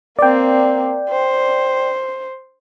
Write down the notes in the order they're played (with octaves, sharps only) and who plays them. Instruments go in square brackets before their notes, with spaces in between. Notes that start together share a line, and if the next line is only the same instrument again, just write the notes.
[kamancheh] A#3 C4 [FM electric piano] D5 G5
[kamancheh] C5